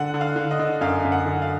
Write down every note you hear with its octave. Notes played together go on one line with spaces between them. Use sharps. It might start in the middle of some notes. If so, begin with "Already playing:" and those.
Already playing: D3 F#5
D3
F5
D3
D#5
D3
F#2 F5
F#2
F#5
D3
F5